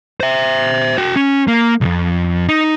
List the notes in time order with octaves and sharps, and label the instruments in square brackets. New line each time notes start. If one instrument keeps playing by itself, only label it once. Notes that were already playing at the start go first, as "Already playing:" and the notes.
[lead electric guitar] C5 E5
F#4 G5
C#4
A#3
B1 F2
D#4